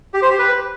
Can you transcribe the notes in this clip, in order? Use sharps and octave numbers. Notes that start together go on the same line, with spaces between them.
G4
C5
G4
B4